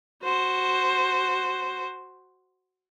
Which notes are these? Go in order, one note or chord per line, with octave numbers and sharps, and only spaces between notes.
F#4 C5